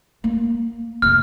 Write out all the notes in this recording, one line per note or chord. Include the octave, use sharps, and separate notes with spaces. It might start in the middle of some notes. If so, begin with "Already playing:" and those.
A#3
F1 C3 F6